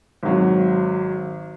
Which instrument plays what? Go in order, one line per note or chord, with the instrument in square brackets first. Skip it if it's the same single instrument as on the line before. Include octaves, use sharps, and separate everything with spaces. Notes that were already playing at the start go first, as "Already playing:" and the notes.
[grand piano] G#1 F#3